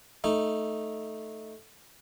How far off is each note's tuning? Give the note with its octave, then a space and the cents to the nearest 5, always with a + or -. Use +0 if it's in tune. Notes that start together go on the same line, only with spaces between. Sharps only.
A3 +0 D#4 +0